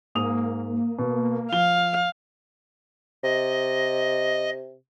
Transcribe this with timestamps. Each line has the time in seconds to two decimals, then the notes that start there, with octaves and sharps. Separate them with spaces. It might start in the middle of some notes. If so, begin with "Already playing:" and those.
0.15 G#2 A#3 D#6 F7
0.99 B2
1.52 F3 F5 G7
3.24 C3 D#5